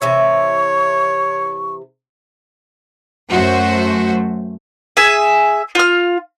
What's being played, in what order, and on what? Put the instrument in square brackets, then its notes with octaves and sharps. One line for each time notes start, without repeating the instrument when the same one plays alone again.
[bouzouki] C3 E3 E5 [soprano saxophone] C#5 [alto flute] C#6
[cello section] F#2 A3 F#4 C5
[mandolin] G#4 E5 G#5
F4 F6